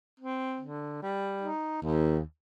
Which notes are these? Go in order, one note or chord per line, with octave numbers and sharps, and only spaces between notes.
C4
D3
G3
D#4
D#2